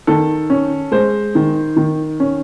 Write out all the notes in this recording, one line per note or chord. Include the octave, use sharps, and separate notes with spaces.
D#3 A4
C#4
G#3 C5
D#3
D#3
C#4